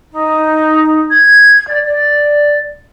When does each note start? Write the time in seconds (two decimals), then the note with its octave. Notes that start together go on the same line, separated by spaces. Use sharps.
0.12 D#4
1.11 G#6
1.67 D5
1.82 D5